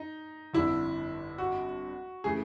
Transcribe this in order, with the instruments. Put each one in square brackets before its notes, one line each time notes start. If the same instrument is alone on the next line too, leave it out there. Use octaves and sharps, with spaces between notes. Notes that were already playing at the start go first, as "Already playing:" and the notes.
Already playing: [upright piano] D#4
[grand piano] G1 F2 D3 [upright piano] E4
[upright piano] F#4
[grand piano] C#3 E3 A3 [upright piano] G#4